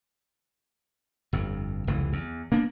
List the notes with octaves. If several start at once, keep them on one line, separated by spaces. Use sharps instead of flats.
G1 F2
F1 C#2 E3
E2
A#3 B3 D4